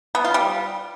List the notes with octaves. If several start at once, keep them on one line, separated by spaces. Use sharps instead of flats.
B3
F4
G3